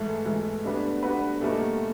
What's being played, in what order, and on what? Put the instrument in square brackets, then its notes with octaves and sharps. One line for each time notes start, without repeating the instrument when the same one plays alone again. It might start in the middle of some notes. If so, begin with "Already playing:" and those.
Already playing: [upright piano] G#2 E3 G#3 [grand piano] A3
[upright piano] G#2 E3 G#3
G3 B3 D4 F#4 B4
G3 B3 D4 F#4 B4
[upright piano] E2 B2 G3 A#3 D#4 [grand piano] A3